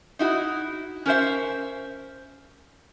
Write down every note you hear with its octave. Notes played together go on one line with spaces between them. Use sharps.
D#4 E4 F#4
C#4 A#4 C5 E5